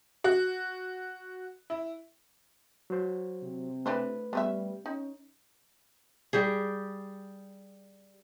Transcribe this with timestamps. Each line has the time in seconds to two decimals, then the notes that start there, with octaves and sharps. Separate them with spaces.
0.24 F#4
1.70 E4
2.90 F#3 C5
3.43 C3
3.86 A3 D4 E4 B4 C5
4.33 G3 B3 C#4 E5
4.86 C#4 D#4
6.33 G3 G4 G#4